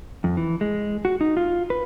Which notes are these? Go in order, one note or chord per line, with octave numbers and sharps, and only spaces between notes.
F2
E3
G#3
F#4
D#4
F4
B4